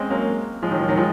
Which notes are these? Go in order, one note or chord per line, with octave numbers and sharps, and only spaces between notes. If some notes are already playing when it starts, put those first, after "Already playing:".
Already playing: G#3 C4 C#4
F#3 A#3
F3 G#3
D#3 F#3
F3
D#3 F#3
F3 G#3